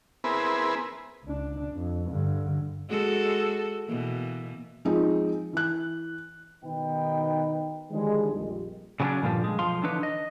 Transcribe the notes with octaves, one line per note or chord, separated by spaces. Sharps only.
B3 C4 E4 G#4 A#4 B4
C#2 D4
F2
G2 D3
G#3 F#4 A4
B2 E3 A#3
F3 G#3 C4 D#4
E3 F#6
B2 D#3 B3 D#4 B4 G5
D3 D#3 F3 G3 G#3
A#1 F2 G3
C#3 F#3 A3 B3 C#4 D4
G2 A#2 D3 F3 G3
G#3
B1 F3 F5 C6
D3 E3 D4 D#4 B4 C#5
D#5